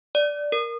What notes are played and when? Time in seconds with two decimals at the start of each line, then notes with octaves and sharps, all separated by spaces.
0.15 D5
0.52 A#4